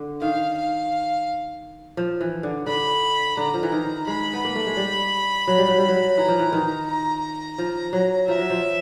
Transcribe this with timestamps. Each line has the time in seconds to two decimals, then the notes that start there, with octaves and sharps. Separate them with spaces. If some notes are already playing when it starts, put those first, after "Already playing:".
Already playing: D3
0.21 D#3 F5
0.57 F5
1.97 F3
2.21 E3
2.43 D3
2.66 D3 B5
3.37 D3 A#5
3.54 F3
3.63 E3
3.72 D#3
4.07 G#3 B5
4.33 B3
4.45 A#3
4.56 A3
4.67 G#3
4.77 G3
5.48 F#3
5.58 G3
5.68 F#3
5.79 G3
5.88 F#3
6.17 E3 A#5
6.28 F3
6.39 E3
6.53 D#3
6.87 A#5
7.58 F3
7.93 F#3
8.28 F3 E5
8.39 F#3
8.50 F3